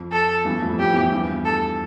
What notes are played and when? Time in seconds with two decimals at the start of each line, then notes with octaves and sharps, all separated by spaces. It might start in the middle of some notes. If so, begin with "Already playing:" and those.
Already playing: F2
0.12 A4
0.45 E2 G2
0.62 F2 A2
0.79 F2 G4
0.90 E2
1.00 E2
1.11 E2 G2
1.45 A4